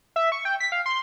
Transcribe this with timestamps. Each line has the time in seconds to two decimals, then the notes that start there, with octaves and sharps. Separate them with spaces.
0.16 E5
0.32 C#6
0.45 G5
0.60 B6
0.72 F5
0.86 C6